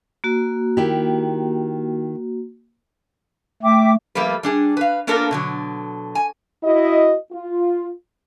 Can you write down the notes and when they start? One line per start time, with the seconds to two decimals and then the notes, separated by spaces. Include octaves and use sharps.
0.24 A#3 F#4
0.77 D#3 E4 G4
3.63 A3 E5 G5 D6
4.15 F3 G3 A3 A#3 B4
4.43 G3 D4 G#4
4.77 B4 F5
5.07 A#3 B3 D4 F4 A4 A#4
5.31 B2 D3 F#3
6.15 G#5
6.64 E4 F#4 D#5
7.33 F4